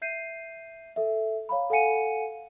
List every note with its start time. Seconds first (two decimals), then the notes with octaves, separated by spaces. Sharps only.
0.02 E5 G6 C7 D#7
0.96 A4 E5
1.49 C#5 F5 A#5 B5
1.70 A4 F5 F#5 G#5 C#7 D#7